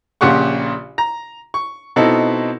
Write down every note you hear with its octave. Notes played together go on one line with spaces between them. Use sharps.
A#1 A#2 C#3 G4 F#5 C#6
A#5
C#6
B2 C4 D#4 E4 A4